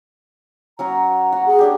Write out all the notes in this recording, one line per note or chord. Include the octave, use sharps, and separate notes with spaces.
F#3 C#4 F#4 A#5
F#4 F#5
G#4
C#4 D4 G4